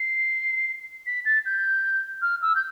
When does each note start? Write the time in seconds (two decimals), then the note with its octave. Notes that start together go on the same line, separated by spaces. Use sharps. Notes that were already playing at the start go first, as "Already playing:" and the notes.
Already playing: C7
1.07 B6
1.25 A6
1.46 G6
2.22 F6
2.42 E6
2.56 G6